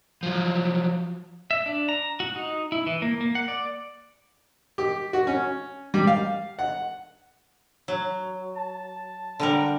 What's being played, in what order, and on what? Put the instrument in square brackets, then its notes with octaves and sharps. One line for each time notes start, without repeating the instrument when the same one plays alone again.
[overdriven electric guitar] F3 F#3
[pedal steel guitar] E5
D4
A#5
F#4
D#4
E4
E3
A#3
A#3
F#5
D5
[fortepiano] G4
F#4
C#4
G3
F5
F#5
[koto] F#3
[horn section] A5
[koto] D3 G3 A#4 [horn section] C5 F#5 A#5